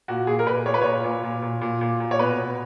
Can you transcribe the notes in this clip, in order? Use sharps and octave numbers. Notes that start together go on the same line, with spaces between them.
A#2 F#4
A#2 G#4
A#4
A#2 B4
A#2 C#5
B4
A#2 C#5
A#2
A#2
A#2
A#2
A#2
A#2
C#5
B2 B4
B2